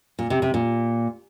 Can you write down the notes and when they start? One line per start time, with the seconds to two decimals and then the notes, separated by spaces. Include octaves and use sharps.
0.19 A#2
0.30 C3
0.42 C3
0.54 A#2